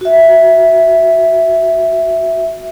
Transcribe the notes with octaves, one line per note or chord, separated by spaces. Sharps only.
F#4 E5